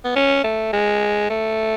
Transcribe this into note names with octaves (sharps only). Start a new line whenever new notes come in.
B3
C#4
A3
G#3
A3